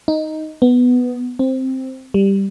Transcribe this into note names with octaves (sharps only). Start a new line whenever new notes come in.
D#4
B3
C4
G3